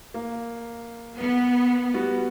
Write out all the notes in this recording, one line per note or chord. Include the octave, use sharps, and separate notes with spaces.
A#3
B3
G3 B3 F#4